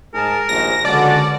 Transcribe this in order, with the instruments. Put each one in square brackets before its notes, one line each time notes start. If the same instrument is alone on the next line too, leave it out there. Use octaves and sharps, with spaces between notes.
[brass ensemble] G#2 G#4 A5 [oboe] A#4
[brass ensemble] A#1 D#2 G#2 [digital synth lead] A#6
[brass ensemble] C#2 C#4 F#4 [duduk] D3 [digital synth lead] D5 [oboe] A5